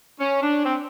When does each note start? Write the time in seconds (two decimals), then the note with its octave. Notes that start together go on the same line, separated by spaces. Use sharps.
0.19 C#4
0.42 D4
0.64 C4